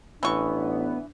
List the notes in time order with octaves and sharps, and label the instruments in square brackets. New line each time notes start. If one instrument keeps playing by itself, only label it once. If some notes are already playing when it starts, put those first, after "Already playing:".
[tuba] A1 [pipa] E3 C#6 [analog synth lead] B3 [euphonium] D4